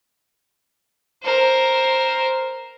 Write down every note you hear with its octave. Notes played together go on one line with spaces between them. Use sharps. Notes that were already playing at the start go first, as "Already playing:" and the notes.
A#4 C5